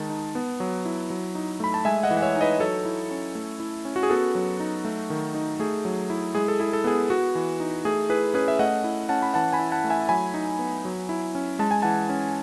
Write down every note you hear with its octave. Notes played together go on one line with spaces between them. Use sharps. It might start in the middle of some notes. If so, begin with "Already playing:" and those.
Already playing: D#3 G#3 A5
D#4
B3
F#3
E4
F#3
D#4
A3 B5
A5
G#3 E5 G#5
D#5 F#5
E3
F#5
C#5 E5
D#4
B4 D#5
F#3 A4 C#5
E4
C#4
A3
E4
C#4
F#4
G#4
B3 F#4 A4
F#3
D#4
A3
D#3
D#4
A3 G#4
F#3
E4
G#3 G#4
A4
E4 G#4
A4
B3 G#4
B3 F#4
E3
D#4
A3 G#4
E4 G#4 B4
C#4 G#4 B4
E5
A3 D#5 F#5
E4
C#4 F#5 A5
B5
E3 F#5 A5
G#5 B5
E4
F#5 A5
A3
E5 G#5
F#3 G#5 B5
D#4
B3
F#3
E4
C#4
G#3 A5
G#5
E3 F#5 A5
C#4